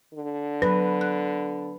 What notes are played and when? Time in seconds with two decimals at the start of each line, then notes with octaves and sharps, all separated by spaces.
0.14 D3
0.62 F#3 B4
1.01 F#6